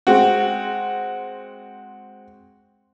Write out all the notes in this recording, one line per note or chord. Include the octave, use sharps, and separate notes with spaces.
G#3 C4 F#4